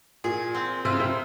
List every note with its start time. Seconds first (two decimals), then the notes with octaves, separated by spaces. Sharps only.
0.24 A#2 G#4
0.54 C4
0.85 C3 F4
0.93 C#3
1.00 C3